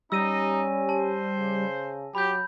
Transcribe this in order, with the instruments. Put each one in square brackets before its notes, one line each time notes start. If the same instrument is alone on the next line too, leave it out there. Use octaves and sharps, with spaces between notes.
[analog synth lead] G3 [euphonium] C#4 [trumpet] D#4 [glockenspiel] E6 A#6 D#7
[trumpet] C5 [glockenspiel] A5
[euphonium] C#3
[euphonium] F#3 [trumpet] G4 [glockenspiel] B5 G6